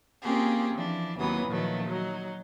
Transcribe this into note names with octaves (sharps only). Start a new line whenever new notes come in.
A#3 C4 C#4 F4 G4 G#4
E3 F3 D4
D#2 C3 E3 F#3 B3 D#6
A#2 D#3 F3 F#3 A3 B3
F#3 D#4